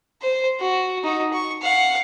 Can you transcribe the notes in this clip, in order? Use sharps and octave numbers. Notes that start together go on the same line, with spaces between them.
C5
F#4
D#4 F#4
C#6
F5 F#5